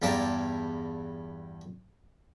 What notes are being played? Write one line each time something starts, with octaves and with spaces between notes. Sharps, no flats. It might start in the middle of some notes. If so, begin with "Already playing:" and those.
E2 G2 D5 G5 A5 A#5